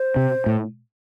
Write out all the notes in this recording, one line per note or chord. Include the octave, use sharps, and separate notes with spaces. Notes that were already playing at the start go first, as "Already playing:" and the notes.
Already playing: C5
C3
A2